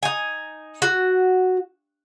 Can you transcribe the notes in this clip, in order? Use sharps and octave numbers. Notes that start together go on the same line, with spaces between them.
D#4 G#5
F#4